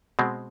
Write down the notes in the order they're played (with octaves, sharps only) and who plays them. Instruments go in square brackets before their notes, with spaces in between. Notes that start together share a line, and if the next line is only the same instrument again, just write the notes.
[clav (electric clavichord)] B2 G#3 C4